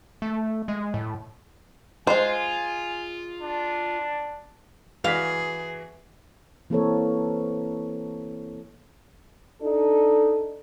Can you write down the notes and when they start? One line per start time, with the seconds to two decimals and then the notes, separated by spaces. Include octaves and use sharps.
0.22 A3
0.68 G#3
0.94 A2
2.07 G#3 F4 C5 G#5
3.41 D4
5.04 E3 F#4 G#4 F5 B6
6.70 E3 A#3 C4 A4 A#4 C#5
9.62 D4 D#4 A4